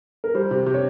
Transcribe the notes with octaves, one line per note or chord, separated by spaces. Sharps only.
A#4
G3 C5
C3
C3
C#5